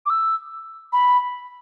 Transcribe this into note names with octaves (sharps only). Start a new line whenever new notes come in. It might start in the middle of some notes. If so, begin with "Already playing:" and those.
D6
E6
B5